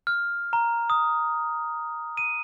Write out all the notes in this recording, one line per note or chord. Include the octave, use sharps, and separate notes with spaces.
F6
A#5
D#6
D#7